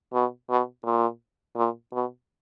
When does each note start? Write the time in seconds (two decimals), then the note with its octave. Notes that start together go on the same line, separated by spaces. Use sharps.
0.13 B2
0.49 B2
0.84 A#2
1.56 A#2
1.93 B2